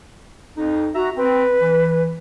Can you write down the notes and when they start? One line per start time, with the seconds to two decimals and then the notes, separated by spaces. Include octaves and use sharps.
0.57 F2 D#4
0.95 F#4 E5 A#5
1.17 C4 B4
1.61 E3